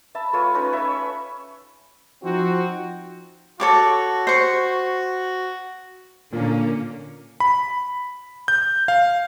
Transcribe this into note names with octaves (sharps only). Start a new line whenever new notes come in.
E5 A5 B5
A3 F4 B4 C#5
C#4 D#4 B4 C#5
C#5 E5 B5
F3 C4 D#4 F#4
F#4 A4 C#5 D6
C5 C#6
A#2 D3 A#3 C#4
B5
G6
F5